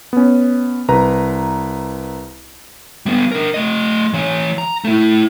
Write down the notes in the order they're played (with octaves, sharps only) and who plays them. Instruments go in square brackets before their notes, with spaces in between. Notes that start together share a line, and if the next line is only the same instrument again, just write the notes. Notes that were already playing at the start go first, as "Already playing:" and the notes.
[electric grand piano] B3 C#4
C2 B4 A#5
[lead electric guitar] G3 B3
D4 A#4
A3 D#5
E3 C#5
A#5
A3 E4